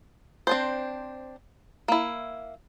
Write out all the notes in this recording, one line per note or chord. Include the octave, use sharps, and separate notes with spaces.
C4 D4 C5
A#3 E4